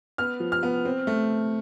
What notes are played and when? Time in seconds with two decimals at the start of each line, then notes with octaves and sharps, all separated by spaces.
0.18 B3 F6
0.40 F3
0.52 F6
0.63 B3
0.85 C4
1.07 A3